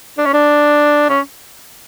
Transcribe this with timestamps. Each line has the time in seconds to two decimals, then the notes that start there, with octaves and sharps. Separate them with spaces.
0.18 D4
0.26 C#4
0.34 D4
1.10 C#4